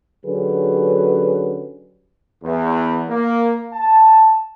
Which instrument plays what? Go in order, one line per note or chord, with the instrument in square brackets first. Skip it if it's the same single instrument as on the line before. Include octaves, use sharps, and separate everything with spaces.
[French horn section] D3 F#3 C#4 G4 G#4 B4
[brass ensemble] E2
A#3
A5